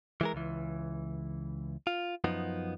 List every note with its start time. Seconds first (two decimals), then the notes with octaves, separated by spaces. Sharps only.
0.21 E3 G#3 A#4
0.34 C#2 E3
1.87 F4
2.24 F#2 F3 B3 D#4